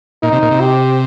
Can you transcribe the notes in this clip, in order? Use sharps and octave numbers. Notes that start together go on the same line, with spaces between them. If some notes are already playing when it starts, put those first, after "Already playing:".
A#2 D#4
C3
A#2
C3
G4